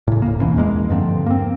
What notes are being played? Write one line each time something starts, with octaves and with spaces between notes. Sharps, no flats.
A2 C#3
D1 A#3
D#2 B2 E3 C#4
E2 G#3 A#3
G2 D3 F3 C4
A#3 C4